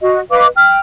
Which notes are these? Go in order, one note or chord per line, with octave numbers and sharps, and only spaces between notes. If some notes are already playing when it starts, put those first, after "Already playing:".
F#4 D#5
B4 D#5 F5 D6
G5 F6